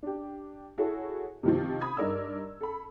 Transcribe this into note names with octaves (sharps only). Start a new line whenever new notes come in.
D4 G4
E4 F#4 G#4 A4 C#5
C3 D#3 F3
B5 D#6 G#6
G2 D#4 A#4 D5 E6
A4 B5